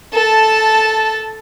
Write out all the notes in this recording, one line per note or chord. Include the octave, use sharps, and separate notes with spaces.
A4 A5